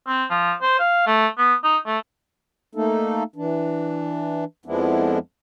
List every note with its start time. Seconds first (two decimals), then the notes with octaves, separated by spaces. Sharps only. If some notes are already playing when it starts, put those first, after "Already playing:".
0.07 C4
0.30 F3
0.62 C5
0.79 F5
1.07 A3
1.38 B3
1.64 D#4
1.86 A3
2.75 A3 A#3 D#4 A4
3.36 E3 D4
4.66 F2 F3 G#3 B3 D4 E4